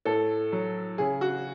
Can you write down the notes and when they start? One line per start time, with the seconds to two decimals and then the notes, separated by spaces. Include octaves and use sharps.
0.05 A2 A4
0.52 F#3
0.98 C#3 G#4
1.21 F#4